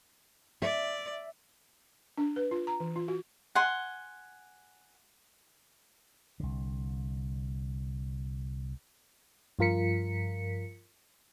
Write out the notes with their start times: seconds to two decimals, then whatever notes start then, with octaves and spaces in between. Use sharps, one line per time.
0.62 D5 E5
2.18 D4
2.36 B4
2.51 F4
2.67 A#5
2.80 E3
2.96 F4
3.08 F#4
3.55 F#5 G#5 C6
6.40 C2 D3
9.59 G2 F3 F4 A#4 B6 C#7